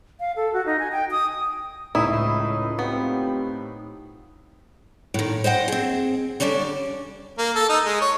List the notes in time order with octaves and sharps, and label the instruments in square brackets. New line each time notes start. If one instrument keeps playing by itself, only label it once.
[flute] F5
A4
F#4
D#4
G#5
G5
D#6
[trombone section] C#2 [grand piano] A2 [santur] D#4 D#6 [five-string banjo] E4
[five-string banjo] B3 [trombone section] C4 F4 G4
[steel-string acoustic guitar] A2 D#3
C5 D#5 F#5 G5
C4 G#4
D3 G3 C#4 D4 A4
[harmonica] A#3
A4
D#4
G#3
C#5